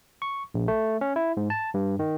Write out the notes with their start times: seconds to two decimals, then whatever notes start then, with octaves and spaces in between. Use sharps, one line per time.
0.22 C#6
0.54 A#1
0.68 A3
1.01 C#4
1.16 E4
1.37 G#2
1.50 A5
1.74 G2
1.99 D#3